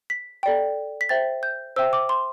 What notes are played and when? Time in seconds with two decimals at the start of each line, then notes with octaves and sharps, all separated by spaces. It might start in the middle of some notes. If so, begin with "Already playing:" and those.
0.10 B6
0.43 A4 D5 G5
1.01 B6
1.09 C5 E5 G5 A6
1.43 G6
1.76 C5 E5 G5 E6
1.93 D6
2.09 C6